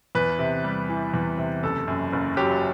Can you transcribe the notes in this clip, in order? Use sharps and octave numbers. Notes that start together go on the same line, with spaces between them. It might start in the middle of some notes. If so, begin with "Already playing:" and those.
E2 B4
C3
G3
E3
E2
C3
F#1 A4
F#2
F#1
F#3 G4